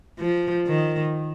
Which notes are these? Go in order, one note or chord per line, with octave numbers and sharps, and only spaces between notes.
F3
D#3